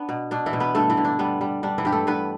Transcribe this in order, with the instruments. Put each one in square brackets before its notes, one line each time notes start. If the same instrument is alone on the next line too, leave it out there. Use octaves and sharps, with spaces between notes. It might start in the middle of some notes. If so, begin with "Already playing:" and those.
Already playing: [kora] B3 D4
B2
B2 D4
E3 E4
B2
B3 B4
G2 A3 A4
E3 E4
D3
D4
G3 B3
G3
G3 D4
E3 E4
G2 G4
A3 A4
G2 B3 B4